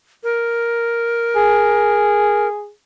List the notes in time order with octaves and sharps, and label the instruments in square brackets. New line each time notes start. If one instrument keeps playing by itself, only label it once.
[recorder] A#4
[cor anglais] G#4